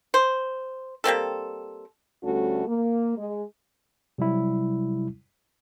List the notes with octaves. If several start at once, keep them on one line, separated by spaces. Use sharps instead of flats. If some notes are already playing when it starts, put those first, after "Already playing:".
C5
G3 A#3 C4 A4
D2 G3 A3 C#4 F#4 A4
A#3
G#3
C3 F#3 G3 E4